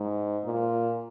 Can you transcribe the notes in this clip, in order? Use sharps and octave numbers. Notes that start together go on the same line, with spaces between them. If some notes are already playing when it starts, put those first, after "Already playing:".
Already playing: G#2
A#2